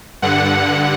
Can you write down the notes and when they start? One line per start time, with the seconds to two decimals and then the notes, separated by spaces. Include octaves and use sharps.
0.22 G2 D3 F#5
0.64 F#5